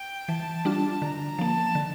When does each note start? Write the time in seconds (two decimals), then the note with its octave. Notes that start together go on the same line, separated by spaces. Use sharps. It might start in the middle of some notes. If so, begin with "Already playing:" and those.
Already playing: G5
0.28 E3 A5
0.65 G3 D4 F4
1.02 D3 A#5
1.39 F3 A#3 A5
1.75 D3